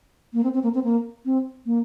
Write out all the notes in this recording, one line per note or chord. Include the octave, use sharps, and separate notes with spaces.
A#3
C4
C4
A#3
C4
A#3
C4
A#3